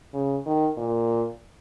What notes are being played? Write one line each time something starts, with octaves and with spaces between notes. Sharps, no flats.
C#3
D#3
A#2